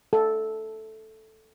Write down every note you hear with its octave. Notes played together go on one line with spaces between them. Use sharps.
A4